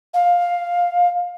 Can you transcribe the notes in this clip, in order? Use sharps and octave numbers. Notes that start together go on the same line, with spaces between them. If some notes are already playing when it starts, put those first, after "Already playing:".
F5